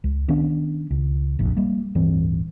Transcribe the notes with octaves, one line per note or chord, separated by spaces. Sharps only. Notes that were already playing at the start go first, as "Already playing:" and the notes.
C#2
D#3 B3 C#4 D4
C#2
F1 A#1
G3 A#3
D1 G2 E3 C4